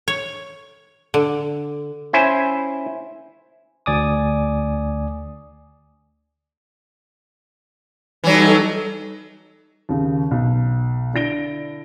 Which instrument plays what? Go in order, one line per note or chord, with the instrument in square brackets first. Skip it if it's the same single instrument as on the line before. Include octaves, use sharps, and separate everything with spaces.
[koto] C#5
D3
[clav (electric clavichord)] C#4 E4 C5 G#5
[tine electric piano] D2 D5 G#5 D6 D#6
[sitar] E3 F#3 [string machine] G3 D#4 A4
[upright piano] D#2 C#3
B1
D3 D4 E4 A#6 D7 G7